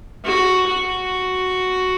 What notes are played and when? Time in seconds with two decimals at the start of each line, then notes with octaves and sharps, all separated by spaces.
0.25 F#4
0.68 F#4